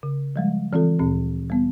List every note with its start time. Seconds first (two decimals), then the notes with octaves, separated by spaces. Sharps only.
0.03 C#3
0.36 F3 G3 G#3
0.73 E3 C4 F4 A4
0.99 D2 A#2 C4
1.50 G3 B3